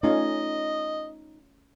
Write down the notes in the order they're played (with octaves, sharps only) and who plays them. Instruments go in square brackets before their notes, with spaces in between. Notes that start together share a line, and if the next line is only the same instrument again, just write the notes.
[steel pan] A3 C#4 F4 [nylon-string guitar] D#4 [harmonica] D#5